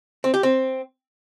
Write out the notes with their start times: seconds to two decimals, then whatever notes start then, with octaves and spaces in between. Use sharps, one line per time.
0.24 C4
0.34 G4
0.43 C4